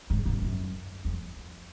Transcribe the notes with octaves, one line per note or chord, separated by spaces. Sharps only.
G#2
F#2
F#2
F2